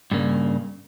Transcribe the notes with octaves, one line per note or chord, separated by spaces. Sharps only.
G2 C#3 A#3